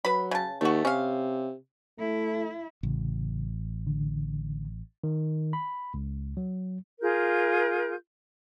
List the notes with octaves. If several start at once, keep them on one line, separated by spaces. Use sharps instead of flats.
F#3 B4 B5
C#3 A5
D#2 A3 F#4
C3 C#4 F5
A3 E4
A1 C#3
D3
D#3
B5
C#2
F#3
F4 G#4 A#4 G6